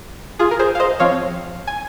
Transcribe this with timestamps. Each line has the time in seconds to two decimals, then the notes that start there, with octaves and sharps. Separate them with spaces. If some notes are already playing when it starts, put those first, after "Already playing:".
0.39 F4 G#4
0.51 A#4
0.59 G#4 C5
0.75 F5
0.80 C5 D#5
1.00 F3 C4 C#5 F5
1.67 G#5